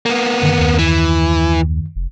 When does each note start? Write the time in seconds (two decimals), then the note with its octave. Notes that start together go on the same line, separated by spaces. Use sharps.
0.06 A#3 B3
0.42 F#2 D3 D#3
0.59 D#2
0.79 E3
1.96 F1